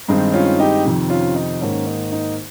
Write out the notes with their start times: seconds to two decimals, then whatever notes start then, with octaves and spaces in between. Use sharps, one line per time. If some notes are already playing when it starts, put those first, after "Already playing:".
0.08 G2 D#3 G#3 C4 D#4
0.34 C#4 F4
0.59 D#4 G4
0.85 F2 C3 D#3
1.10 C#4 F4
1.35 D#4
1.61 G#2 D#3 A#3 C#4
1.86 D#4
2.12 D#4